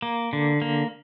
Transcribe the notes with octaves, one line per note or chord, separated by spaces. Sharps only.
A#3
D3
A#3